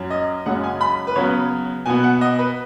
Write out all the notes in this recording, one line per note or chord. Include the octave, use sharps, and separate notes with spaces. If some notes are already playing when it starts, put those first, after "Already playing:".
Already playing: F#2 F#3 C#4
D#5
F#2 C#3 G#3 C#4 F#5
G#5
B5
B4
C#3 F#3 B3 C#5
B2 B3 G#5
F#5
D#5
B4